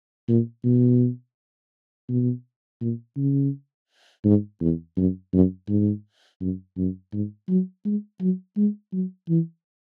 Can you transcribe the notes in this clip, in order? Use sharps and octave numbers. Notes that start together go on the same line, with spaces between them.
A#2
B2
B2
A#2
C#3
G#2
E2
F#2
F#2
G#2
F#2
F#2
G#2
F#3
G#3
F#3
G#3
F#3
E3